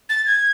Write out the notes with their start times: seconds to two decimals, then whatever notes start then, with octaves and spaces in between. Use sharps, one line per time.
0.09 A6
0.26 G#6